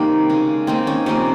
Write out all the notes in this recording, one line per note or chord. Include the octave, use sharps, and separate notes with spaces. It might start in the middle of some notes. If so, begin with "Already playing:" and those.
Already playing: C3 D#3 G3 A#3 C4 D#4
C#3 G#3
D#3 A#3 C4 D#4
C#4
C3 F3 A#3 C#4